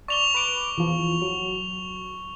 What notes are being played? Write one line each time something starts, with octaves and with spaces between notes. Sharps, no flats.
D5 C#6 F7 G7
B4 D6
E2 F3
F#3